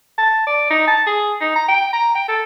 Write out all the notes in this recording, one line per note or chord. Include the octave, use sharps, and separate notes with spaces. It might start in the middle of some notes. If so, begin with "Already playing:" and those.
A5
D5
D#4
A5
G#4
D#4
A#5
G5
A#5
G5
A4